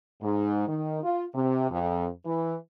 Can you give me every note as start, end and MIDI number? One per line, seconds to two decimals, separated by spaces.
0.23 0.64 44
0.68 0.99 51
1.03 1.23 65
1.35 1.68 48
1.71 2.07 41
2.26 2.55 52